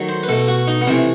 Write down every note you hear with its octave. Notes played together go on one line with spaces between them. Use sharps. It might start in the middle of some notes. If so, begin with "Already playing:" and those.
Already playing: D#3 F#3 A3
C5
B4
B2 A3 A4
F#4
D#4
B3
C3 E3 A3 C4